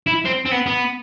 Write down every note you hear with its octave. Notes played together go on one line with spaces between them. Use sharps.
E4
C4
C4
B3
B3